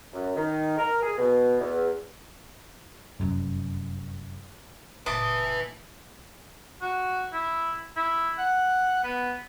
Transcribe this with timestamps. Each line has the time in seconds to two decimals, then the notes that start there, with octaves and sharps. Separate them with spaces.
0.13 F#2
0.35 D#3
0.77 A#4
1.02 G#4
1.18 B2
1.60 E2
3.20 F1 F#2
5.06 F#1 A#2 B4 E5 A5 D6 D#6
6.81 F#4
7.33 E4
7.96 E4
8.38 F#5
9.04 B3